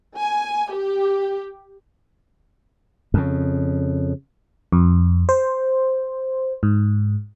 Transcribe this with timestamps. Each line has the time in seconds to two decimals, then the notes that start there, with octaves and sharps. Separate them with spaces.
0.16 G#5
0.72 G4
3.14 F2 C#3
4.72 F2
5.29 C5
6.63 G#2